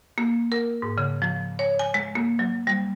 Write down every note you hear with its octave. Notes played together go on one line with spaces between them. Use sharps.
A#3
A#4
G#2
C#3
F3
C#5
G#5
G#3
A#3
F#3
G3